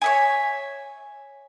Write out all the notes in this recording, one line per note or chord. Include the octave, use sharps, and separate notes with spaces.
C#5 E5 G#5